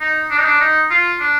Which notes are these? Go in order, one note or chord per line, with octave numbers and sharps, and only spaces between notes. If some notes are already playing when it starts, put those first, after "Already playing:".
D#4
D4
D#4
D4
D#4
F4
D4